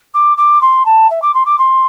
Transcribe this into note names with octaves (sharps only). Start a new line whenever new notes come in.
D6
D6
C6
A5
E5
D6
C6
D6
C6